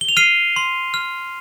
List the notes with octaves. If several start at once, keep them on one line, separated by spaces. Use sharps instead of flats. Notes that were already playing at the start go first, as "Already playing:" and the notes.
G7
F7
F6 C7 D#7
C6
F6